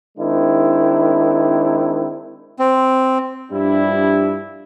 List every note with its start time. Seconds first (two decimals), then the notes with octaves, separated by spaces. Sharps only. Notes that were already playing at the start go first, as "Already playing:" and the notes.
0.18 D#3 G#3 C4 D4 E4
2.59 C4
3.52 G2 F3 G3 D4 E4